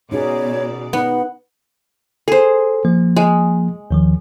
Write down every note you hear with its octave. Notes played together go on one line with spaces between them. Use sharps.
B2 C#4 D#4 G#4 C#5 D5
B3 D#4 F#5
G#4 A4 C5
F3 A#3
G#3
D#2 D#3 F3